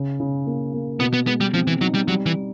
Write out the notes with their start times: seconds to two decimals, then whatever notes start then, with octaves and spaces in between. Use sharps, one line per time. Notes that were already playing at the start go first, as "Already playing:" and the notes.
Already playing: C#3
0.20 C#3
0.46 A#3
0.73 A#3
1.00 B2 B3
1.13 B3
1.27 G#3 B3
1.41 G3
1.54 F3 C4
1.67 E3
1.81 F#3 D#4
1.94 G3
2.08 F#3 G3
2.26 E3
2.34 G3